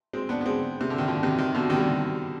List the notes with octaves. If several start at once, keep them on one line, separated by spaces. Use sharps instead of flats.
G#3 C4
B3 D4
B3
G#3 C4
C3
D3
D#3
D3 F3
C3 D#3
C3 D#3
B2 D3
C3 D#3
G3
D3